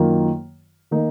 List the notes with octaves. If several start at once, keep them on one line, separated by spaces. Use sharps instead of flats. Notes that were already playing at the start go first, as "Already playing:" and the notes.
Already playing: F#2 D#3 A#3 F4
D#3 A#3 D#4